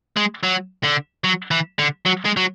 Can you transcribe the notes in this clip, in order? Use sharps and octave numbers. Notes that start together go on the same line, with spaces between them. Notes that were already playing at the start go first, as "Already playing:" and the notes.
G#3
F#3
D3
F#3
E3
D3
F#3
G#3
F#3